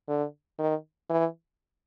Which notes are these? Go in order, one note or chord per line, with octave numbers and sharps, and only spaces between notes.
D3
D#3
E3